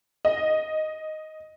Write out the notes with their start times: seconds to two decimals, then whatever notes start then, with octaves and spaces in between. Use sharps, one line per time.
0.25 D#5